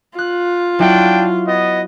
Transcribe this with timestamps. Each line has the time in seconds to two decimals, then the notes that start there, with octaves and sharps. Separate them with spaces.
0.18 F4 F#6
0.79 F#3 D4 E4 F#5 G5
1.46 B3 D#5